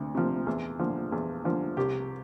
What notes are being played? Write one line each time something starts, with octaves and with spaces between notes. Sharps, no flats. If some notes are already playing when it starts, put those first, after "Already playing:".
Already playing: D2 C3
C3 F3
E2
D3 F3
E2
D3 F3
C2 G4